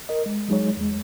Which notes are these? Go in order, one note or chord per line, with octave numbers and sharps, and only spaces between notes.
A#4 D#5
G#3
F#3 G#3 D#4 G#4 C#5
E2 G#3